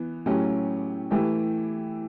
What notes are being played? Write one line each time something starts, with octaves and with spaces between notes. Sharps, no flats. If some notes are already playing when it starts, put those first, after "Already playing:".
Already playing: E3 B3
A2 F#3 A3 C#4 G4
E3 A3 E4 G4